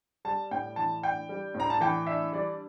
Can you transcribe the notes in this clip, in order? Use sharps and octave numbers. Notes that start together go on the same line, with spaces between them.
G3 A5
A2 G5
E3 A5
D4 G5
G3
A2
A#5
A5
E3 G5
D4 E5
G3 D5